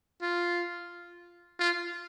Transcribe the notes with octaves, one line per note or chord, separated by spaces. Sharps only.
F4
F4